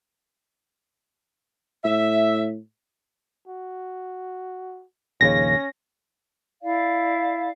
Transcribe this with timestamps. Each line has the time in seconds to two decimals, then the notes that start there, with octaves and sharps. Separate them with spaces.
1.85 A2 E5
3.48 F#4
5.21 A#1 D#2 C#3 C#4 A#6
6.62 E4 D5 F5